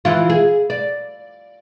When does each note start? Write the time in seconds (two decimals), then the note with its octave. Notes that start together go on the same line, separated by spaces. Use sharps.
0.05 E3 E4 F4
0.30 G#4
0.70 D5